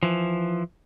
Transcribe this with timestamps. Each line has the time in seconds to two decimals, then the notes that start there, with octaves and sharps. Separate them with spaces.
0.03 E3 F3